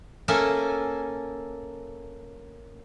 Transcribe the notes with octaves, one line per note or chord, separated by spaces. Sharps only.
A#3 C#4 A4 E5 G#5